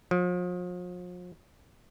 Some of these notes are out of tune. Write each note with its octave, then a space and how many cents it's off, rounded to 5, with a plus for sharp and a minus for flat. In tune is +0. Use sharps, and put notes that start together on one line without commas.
F3 +40